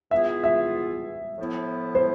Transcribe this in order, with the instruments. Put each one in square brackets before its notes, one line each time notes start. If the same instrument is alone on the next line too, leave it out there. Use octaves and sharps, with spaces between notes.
[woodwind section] E3 B3 F4 G#4 [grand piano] E5
[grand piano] E5
[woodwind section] A2 F3 B3 E4
[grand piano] C5